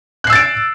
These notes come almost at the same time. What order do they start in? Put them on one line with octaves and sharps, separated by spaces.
F#6 C7 E6 A6 D7